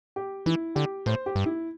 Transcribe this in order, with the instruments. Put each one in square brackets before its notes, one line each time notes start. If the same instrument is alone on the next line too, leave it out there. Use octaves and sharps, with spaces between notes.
[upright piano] G4
[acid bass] E3 [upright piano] E4
[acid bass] D3 [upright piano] G4
[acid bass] A2 [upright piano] C5
[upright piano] G4
[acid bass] G2
[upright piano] E4